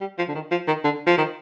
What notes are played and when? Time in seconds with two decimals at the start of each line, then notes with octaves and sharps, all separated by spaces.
0.01 G3
0.18 F3
0.29 D3
0.35 D#3
0.51 F3
0.68 D#3
0.84 D3
1.07 F3
1.18 D#3